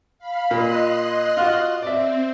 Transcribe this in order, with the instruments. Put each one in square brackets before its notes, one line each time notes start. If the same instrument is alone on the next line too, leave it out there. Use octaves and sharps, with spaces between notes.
[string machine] F5 B5
[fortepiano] A#2 [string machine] D#5 C6 F#6
[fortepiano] F4 F#4
[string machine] C4 [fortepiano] D5 E5